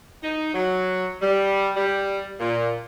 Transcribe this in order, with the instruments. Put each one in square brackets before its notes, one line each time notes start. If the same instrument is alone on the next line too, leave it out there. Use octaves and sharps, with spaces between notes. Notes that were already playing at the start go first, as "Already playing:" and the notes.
[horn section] D#4
F#3
G3
G3
A#2